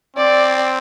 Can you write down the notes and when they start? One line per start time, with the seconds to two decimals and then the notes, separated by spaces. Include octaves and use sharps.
0.17 C4 D5